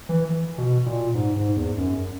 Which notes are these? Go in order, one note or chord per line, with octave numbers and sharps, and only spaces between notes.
E3
B2
A#2
G#2
G#2
E2
F#2